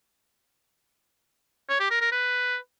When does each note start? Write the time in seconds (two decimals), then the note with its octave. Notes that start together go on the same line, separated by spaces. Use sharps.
1.69 C#5
1.80 G4
1.91 A#4
2.01 A#4
2.12 B4